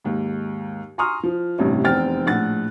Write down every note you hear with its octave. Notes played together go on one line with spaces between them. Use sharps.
D#2 G#2
G#5 A#5 C6 C#6 D#6 F6
F3
A1 G2 C3 C#4 E4
F1 E2 C4 G5 F6 A6
A#1 A2 F#5 F#6 A6